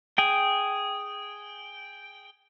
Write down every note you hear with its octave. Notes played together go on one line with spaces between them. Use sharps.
G#4 G5